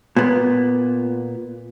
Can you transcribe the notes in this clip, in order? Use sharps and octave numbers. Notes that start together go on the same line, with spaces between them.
A#2 B3